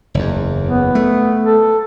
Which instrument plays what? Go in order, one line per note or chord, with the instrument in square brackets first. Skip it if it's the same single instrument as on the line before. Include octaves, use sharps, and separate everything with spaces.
[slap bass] F#1 E2
[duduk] B3
[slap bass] A3
[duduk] A4